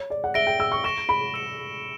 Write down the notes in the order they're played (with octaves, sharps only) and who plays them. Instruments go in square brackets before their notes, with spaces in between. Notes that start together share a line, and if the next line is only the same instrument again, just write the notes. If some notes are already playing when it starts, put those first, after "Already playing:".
Already playing: [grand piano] C#5
D5
F#5
[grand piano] E5 [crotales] A#6 D7 G7
[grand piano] G5
E6
C#6
[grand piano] C#6 [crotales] A#6 E7 G7
[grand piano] B5
[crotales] E6 A#6 C#7 E7